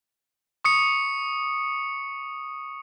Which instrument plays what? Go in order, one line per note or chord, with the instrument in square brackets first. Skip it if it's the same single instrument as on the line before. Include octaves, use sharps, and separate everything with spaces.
[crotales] C#6 D#6 C#7